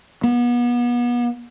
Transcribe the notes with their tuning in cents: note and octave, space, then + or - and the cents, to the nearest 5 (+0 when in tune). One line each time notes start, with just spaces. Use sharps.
B3 -35